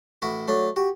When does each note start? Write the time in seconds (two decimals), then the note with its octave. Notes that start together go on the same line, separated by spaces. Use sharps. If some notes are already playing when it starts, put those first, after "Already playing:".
0.22 A1 E4 F#4
0.48 F#3 A3 D4
0.76 F#4 G4